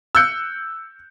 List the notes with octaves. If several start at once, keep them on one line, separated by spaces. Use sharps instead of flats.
E6 F#6 G6 C#7